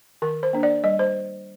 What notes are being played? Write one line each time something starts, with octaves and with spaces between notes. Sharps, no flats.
D#3 A#4
C5
A#3 D4
D5
G3 D#5
C5